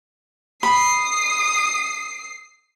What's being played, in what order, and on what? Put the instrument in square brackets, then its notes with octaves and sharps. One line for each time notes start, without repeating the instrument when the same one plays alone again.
[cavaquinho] B5 [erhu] D#6 [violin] C7